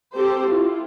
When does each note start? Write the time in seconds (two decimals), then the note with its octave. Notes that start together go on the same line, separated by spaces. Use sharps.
0.14 C4 G4 A4 C5
0.46 E4 F4